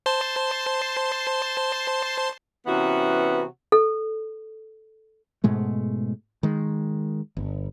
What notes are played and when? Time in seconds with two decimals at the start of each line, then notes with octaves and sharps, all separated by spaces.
0.06 C5 A5 C6
2.67 C3 E3 B3 C#4 F#4
3.72 A4
5.44 G#2 B2 G#3 A3
6.43 D#3 G#3
7.37 G1